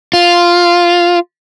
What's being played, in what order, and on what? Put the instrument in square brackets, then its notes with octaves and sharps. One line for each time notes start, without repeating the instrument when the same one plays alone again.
[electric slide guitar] F4